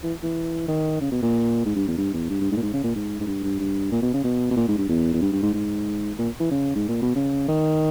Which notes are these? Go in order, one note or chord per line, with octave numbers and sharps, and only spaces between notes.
E3
E3
D#3
C#3
B2
A#2
G#2
G2
E2
G2
E2
G2
G2
G#2
A#2
G#2
C#3
A#2
G#2
G#2
G2
G2
G2
A#2
B2
C#3
B2
B2
A#2
G#2
G2
E2
E2
G2
G2
G#2
G#2
A#2
E3
C#3
G#2
A#2
B2
C#3
D#3